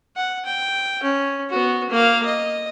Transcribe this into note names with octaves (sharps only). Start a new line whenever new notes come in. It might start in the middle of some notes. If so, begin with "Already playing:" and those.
F#5
G5
C#4
B3 F#4
A#3 F5
D#5